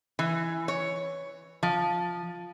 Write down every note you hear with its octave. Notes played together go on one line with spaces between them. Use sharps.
E3
C#5
F3